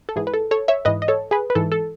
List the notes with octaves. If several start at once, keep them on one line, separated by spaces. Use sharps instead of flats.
A4
G#2 E3 G#4
B4
A4
A4 C#5
C#5 E5
G#2 E3 B4 D#5
D#5
A4 C#5
G#4 B4
B4
G#2 E3 A4
A4